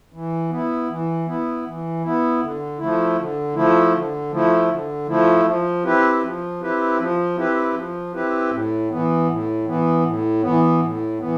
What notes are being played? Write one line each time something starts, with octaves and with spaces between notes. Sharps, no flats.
E3
B3
E4
E3
B3 E4
E3
B3 E4
D3
F3 A3 E4
D3
F3 A3 E4
D3
F3 A3 E4
D3
F3 A3 E4
F3
C4 E4 G4 B4
F3
C4 E4 G4 B4
F3
C4 E4 G4 B4
F3
C4 E4 G4 B4
A2
E3 B3
A2
E3 B3
A2
E3 B3
A2
E3 B3